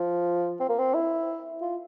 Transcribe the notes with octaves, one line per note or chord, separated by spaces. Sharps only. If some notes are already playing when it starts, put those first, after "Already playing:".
Already playing: F3
C4
A#3
C4
E4
F4